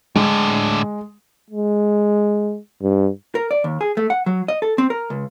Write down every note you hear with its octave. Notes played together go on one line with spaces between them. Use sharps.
A2 D3 G#3
G#3
G2
A#4
D5
D#2
G#4
A3
F#5
F#3
D#5
A4
C4
A#4
C#2